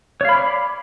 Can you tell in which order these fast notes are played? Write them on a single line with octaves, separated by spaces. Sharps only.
C#5 F5 B5 D5